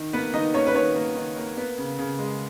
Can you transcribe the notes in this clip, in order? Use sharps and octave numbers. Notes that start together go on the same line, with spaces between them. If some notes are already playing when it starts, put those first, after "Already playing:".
Already playing: D#3
A#3 B3 B4
D#3 D#4 D#5
A#3 C#4 C#5
B4
D#3 C#4 C#5
A#3
D#3
A#3
B3
C#3
C#3
G#3